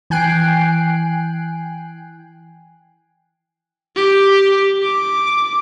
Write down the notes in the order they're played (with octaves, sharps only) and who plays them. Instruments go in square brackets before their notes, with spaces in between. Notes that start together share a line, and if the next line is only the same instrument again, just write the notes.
[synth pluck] E3 G5 G#5 F#6 C7 D7
[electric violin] G4
D6